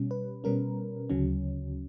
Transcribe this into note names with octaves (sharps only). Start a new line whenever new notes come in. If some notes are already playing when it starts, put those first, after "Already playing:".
Already playing: B2 G3 C#4
B4
B2 G3 C#4 A#4
D2 C#3 F#3 C#4